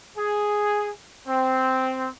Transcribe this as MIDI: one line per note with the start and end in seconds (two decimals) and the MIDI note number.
0.17 0.90 68
1.27 2.08 60